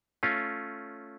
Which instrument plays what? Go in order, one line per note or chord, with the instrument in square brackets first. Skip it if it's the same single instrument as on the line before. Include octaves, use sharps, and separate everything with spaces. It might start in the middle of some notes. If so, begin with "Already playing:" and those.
[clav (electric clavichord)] A3 C#4 F4